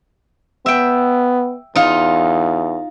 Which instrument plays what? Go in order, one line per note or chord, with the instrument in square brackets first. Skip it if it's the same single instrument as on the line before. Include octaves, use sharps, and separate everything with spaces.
[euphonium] B3 [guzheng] E5 G5
[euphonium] E2 [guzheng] D#4 F4